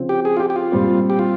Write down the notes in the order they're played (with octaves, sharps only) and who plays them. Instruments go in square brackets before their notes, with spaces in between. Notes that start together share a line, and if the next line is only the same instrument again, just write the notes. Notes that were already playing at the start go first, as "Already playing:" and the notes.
Already playing: [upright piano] C#3 F3 C4
[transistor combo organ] G4
G#4
F4
G4
G4
F4
[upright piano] A#2 G3 C4
[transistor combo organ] G4
F4